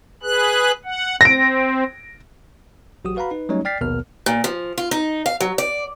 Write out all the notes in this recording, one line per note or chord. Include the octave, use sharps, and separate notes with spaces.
G#4 B4 F#6
F#5
C4 A#6 D7
A1 F#3 F#4 G4 D#6
F#4 B4 F5 F#5 A#5 B5
D#4 B4
F#3 G3 A3 C#4 D#4 C#5
D5 G5 F6 A6 B6 C7
A#1 D#2 B2 B3 A#4 F6
A#2
F3
F4
D#4
F5
F#3
D5